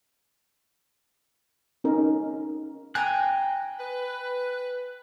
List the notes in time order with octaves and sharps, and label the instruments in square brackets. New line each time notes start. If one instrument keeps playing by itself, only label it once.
[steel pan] C#4 D#4 A#4
[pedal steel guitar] G5 F#6 [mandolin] G#5 A#5
[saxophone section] B4